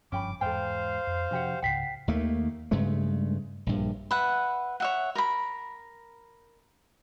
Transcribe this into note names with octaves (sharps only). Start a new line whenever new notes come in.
F#1 G2 F3 C#4 G5 B5 D6
E2 G#2 A4 C5 F5 G5
F2
C3 F3 D4 F#4 G4 F#5
C#2 G#2 C#3 F#5 G5 B6 C7
D#2 D#3 A3 A#3
G2 C#3 G#3 A3
A#1 G2
B4 E5 F#5
C#5 E5 F#5
A#4 B5